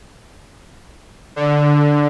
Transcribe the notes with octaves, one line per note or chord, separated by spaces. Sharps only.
D3